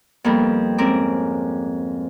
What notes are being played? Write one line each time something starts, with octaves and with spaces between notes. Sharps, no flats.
F2 G3 A#3 B3
G#2 C4 C#4 A#4 D6